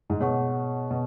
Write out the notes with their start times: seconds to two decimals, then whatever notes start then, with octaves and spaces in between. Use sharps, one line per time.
0.10 G#2
0.20 B2 G#4 C#5 F#5 C#6
0.91 B2